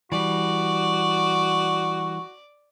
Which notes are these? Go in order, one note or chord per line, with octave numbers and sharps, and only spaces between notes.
E3 G3 F#4 D5